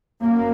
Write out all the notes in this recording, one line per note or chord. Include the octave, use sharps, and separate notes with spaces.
F#2 A#3